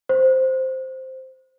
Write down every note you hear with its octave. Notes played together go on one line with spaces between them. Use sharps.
C5